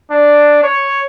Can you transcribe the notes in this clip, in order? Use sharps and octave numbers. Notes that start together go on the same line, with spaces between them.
D4
C#5